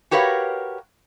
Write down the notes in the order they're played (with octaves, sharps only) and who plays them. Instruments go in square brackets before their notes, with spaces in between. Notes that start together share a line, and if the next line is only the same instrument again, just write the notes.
[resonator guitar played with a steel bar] F#4 G4 A#4 B4 C#5 F5